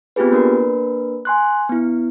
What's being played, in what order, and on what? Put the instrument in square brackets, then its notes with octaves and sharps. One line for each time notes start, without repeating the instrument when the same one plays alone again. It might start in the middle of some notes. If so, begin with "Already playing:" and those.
[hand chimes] B3 C4 F4 G4 G#4 B4
A#3 D4 A#4 B4
G#5 C6 F#6
B3 E4